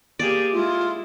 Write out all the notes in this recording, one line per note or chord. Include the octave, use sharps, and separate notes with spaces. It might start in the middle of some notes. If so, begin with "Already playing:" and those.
A#3 G4 G#4 D5
G#3 E4 F4